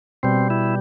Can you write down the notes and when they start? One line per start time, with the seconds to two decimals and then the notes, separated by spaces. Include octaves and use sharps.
0.23 B2 G3 C4
0.50 E4